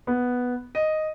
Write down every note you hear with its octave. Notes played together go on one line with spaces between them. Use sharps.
B3
D#5